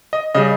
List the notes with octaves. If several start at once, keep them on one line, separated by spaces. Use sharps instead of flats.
D#5
C#3 G3 D#5